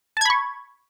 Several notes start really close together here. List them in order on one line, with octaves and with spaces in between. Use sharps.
A5 G#6 B5 C#6